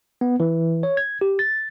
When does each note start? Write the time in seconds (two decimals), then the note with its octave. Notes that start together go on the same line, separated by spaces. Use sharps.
0.21 B3
0.40 E3
0.83 C#5
0.97 G#6
1.21 G4
1.39 A6